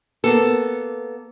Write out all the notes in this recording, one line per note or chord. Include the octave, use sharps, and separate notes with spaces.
A#3 B3 A4